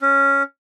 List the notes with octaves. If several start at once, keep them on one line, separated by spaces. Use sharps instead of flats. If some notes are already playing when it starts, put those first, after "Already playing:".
C#4